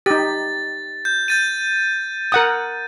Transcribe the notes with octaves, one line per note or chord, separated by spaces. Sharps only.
D#4 G4 A6
G6
G6 A6 D#7
A#4 F#5 D#6